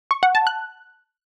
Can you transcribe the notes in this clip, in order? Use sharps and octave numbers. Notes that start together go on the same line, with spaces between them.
C#6
F#5
A5
F#6